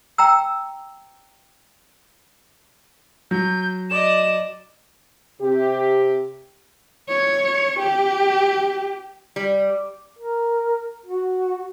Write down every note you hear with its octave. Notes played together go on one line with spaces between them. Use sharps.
G5 A#5 E6
F#3 G6
D5 D#5 E7
C3 G4
C#5
G4
G3
A#4
F#4